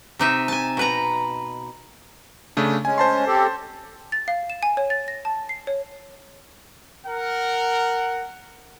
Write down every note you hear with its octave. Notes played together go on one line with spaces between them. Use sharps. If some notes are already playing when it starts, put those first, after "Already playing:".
C3 D#4 E5
G#5 A5
B2 B4 A#5
C#3 A3 D4
G#3 C#4 G#5
C5 A5 C6
C4 G4 A4
A6
F5
E7
G#5
C#5
A6
A#6
A5
C7
C#5
A#4 F#5